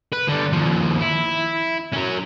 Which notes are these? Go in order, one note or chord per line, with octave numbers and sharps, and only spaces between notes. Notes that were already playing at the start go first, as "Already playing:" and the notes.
B4
D3 G3
D#2 F3
E4
F#3 C#4